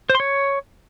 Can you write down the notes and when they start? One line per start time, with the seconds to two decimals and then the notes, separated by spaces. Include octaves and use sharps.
0.10 C5
0.15 C6
0.20 C#5